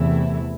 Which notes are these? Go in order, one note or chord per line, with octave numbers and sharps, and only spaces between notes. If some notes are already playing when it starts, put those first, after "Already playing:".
Already playing: E2 C3 E3 A3 E4